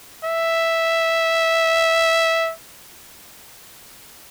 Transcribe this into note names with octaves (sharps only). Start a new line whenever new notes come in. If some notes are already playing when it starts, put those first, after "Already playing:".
E5